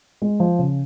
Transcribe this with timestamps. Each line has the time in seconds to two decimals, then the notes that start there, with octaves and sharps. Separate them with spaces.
0.22 G#3
0.40 F3
0.59 C#3